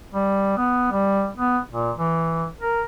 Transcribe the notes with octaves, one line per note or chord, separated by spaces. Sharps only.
G3
B3
G3
B3
A#2
E3
A#4